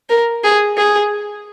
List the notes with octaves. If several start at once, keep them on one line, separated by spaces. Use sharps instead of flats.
A#4
G#4
G#4